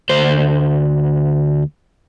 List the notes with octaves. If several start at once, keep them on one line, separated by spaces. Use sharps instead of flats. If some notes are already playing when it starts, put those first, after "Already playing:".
D2 C5